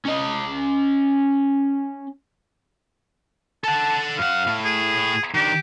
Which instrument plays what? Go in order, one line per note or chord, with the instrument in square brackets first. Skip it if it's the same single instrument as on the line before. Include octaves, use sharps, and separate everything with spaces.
[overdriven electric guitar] C#4 D#5
[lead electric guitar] A4 F#5 [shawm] A5
[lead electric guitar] F#2 F#5 [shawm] F5
[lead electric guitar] A2 A3
[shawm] G#4
[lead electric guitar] D#3 D4 [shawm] G4